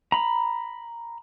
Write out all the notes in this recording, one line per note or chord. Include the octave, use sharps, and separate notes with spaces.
A#5 B5